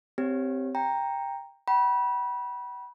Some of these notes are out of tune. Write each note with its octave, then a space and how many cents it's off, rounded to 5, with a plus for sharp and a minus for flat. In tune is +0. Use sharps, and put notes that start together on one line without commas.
C4 -10 G4 +0 C#5 +0
G5 +15 A#5 +0
G5 -45 B5 -25